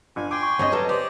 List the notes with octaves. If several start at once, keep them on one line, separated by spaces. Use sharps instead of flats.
G1 G#5
G5 G#5 C6 D6
C#6
D2 G2 C4 C#5 D#5
F#3 G3 A4 B4
G4 C5 D5